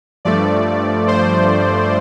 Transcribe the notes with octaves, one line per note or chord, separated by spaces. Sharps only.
G2 F3 A3 D5
C5